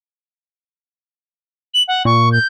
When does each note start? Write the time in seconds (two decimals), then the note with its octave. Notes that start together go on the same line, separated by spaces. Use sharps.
1.74 F#7
1.88 F#5
2.05 A#2 C#6
2.32 G6